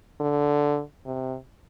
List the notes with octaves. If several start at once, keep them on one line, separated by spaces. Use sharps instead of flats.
D3
C3